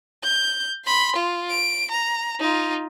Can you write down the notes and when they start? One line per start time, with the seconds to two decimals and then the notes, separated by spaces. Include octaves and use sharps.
0.23 G6
0.85 B5 C6
1.16 F4
1.50 D7
1.91 A#5
2.40 D#4 F4